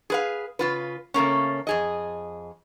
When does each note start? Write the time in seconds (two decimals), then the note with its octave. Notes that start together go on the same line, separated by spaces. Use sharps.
0.10 G#4 B4 F5
0.59 C#3 F4 B4
1.14 C#3 A3 A#3 C#4
1.67 F2 G#4 D#5